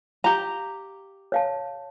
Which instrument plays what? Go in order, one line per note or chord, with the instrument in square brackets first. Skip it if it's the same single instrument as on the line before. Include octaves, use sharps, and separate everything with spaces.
[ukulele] G4 A#5 [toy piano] F5
[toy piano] C#5 F5 A5